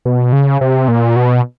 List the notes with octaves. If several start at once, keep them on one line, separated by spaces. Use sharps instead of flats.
B2
C#3
C3
A#2
B2